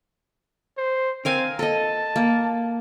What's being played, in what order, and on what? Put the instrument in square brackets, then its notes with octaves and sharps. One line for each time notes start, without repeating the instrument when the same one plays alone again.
[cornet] C5
[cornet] C4 [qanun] A#4 F5 G#5
[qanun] A4 D#5 [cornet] A5
[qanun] A#3